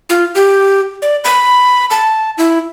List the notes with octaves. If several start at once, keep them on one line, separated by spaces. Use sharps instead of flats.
F4
G4
D5
B5
A5
E4